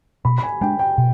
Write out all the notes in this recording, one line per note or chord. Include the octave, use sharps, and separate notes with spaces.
B2 B5
B5
G#5
G#3 D4 G5
G5
B2